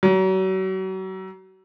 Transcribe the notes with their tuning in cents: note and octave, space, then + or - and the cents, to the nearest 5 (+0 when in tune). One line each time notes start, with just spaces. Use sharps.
F#3 +35